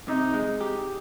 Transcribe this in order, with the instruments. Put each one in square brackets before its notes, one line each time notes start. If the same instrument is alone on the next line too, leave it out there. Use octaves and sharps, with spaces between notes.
[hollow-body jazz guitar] C3 [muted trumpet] D#4
[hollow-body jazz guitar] G#3
G4